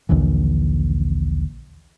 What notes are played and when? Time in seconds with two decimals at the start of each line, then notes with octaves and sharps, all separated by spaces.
0.09 A#1 D#2 D3 E3